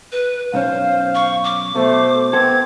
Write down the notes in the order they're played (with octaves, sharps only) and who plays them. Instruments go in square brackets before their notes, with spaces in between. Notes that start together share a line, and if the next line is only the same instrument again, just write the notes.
[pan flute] B4
[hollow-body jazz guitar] B1 F#2 C#4 [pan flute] C5 [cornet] F5
[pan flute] C#6
D6
[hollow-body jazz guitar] B2 [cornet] A3 [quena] C5
[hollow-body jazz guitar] B3 A4 [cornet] C4 [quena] G#6